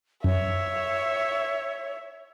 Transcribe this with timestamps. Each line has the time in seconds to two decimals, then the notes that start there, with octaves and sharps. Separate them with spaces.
0.24 F#2 C#5 E5